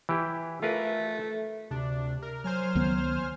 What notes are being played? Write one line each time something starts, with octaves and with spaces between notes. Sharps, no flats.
E3 E4 G4
A3 F4 A#4 B4
D2 C3 D4
A#4
F#3 C5 G#5 F6
C#2 D#3 B3